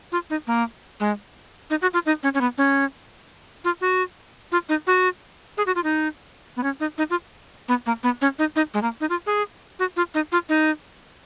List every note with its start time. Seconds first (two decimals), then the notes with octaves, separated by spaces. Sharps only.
0.12 F4
0.30 D#4
0.47 A#3
1.00 G#3
1.70 D#4
1.82 F#4
1.94 F4
2.06 D#4
2.23 C#4
2.34 C#4
2.41 B3
2.58 C#4
3.64 F4
3.81 F#4
4.52 F4
4.69 D#4
4.87 F#4
5.57 G#4
5.66 F#4
5.75 F4
5.84 D#4
6.57 B3
6.63 C#4
6.80 D#4
6.98 D#4
7.10 F4
7.68 B3
7.86 A#3
8.03 B3
8.21 C#4
8.39 D#4
8.56 D#4
8.74 G#3
8.82 A#3
9.01 D#4
9.09 F4
9.26 G#4
9.79 F#4
9.96 F4
10.14 D#4
10.32 F4
10.49 D#4